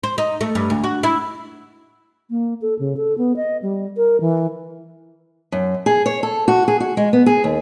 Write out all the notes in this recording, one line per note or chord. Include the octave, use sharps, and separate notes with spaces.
C5
D#4
A3
G2
D2
F#4
E4
A#3
A4
C#3
A4
B3
D#5
G3
A#4
E3
F#2
G#4
C#5
A4
F#4
G#4
F#4
G#3
B3
G#4
D#2